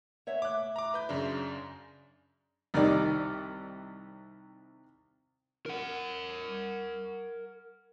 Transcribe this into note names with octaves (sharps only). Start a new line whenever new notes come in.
C#5 E5 F#5
A2 E5 D6 F#6
A#5 D6
B4 G6
F#2 C#3 D4
C2 D#3 G3 D5
A#4 F#5